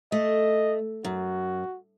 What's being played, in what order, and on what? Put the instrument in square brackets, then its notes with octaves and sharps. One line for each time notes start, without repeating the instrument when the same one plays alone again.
[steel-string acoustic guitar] A3 [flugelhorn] D#5
[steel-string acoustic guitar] F#2 [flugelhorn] F#4